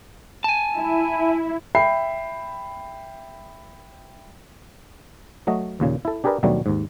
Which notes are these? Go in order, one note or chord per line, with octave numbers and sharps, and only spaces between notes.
G#5 A5
E4
E5 G5 B5 C7
F#3 A3 F#4 D#5
D#2 A#2 C#3
E4 A4
D4 G4 G#4 A#4 B4 D5
D#2 B2 F#3 G3 A3 D4
D#2 G#2